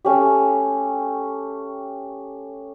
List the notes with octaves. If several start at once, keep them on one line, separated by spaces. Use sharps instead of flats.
A3 C#4 G4